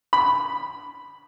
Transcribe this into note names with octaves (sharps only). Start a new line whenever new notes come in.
B5